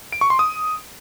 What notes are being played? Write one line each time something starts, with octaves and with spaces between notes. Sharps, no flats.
D7
C#6
C6
D#6